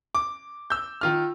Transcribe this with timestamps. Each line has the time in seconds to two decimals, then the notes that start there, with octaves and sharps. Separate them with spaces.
0.15 D6
0.70 E6 G6
1.01 D#3 F4 F6